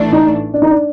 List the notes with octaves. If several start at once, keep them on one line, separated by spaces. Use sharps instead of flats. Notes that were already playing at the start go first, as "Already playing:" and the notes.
Already playing: A1 A2 E3 A3 D4
D#4
D4
D#4
D4